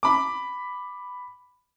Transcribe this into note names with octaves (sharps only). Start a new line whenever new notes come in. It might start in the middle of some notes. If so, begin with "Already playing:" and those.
B5 D6